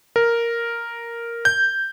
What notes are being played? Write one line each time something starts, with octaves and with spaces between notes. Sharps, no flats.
A#4
G6